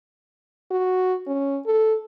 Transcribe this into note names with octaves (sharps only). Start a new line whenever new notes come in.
F#4
C#4
A4